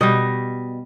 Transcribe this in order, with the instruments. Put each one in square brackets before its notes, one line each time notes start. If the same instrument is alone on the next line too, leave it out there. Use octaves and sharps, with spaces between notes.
[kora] B2 G3 D#5